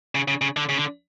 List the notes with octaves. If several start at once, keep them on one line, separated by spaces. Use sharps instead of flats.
C#3
C#3
C#3
D3
C#3
D3